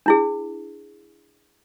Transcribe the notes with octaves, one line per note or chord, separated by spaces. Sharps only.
D4 E4 G#4